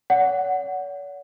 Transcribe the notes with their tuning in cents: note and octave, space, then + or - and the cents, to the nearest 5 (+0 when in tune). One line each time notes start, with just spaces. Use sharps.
C#5 +45 F#5 +0